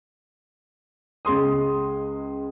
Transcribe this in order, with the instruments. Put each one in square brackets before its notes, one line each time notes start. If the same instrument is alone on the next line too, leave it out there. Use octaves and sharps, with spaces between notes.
[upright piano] C#2 G#3 C6 D#6